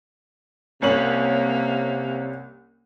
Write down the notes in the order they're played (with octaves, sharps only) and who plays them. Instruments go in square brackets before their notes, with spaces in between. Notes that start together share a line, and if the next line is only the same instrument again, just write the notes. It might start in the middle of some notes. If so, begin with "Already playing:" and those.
[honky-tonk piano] C2 C#4 F#7 [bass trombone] C3 [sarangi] A#3